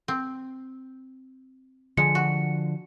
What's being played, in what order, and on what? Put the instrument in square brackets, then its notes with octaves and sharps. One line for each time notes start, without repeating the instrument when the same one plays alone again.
[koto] C4
[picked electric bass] D3 F3 [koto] G#3 [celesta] C#7
[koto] F#4